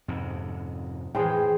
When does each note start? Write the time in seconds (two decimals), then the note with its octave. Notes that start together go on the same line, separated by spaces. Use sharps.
0.08 F2 G#2 C3
1.15 A2 E3 G#4 C5 G5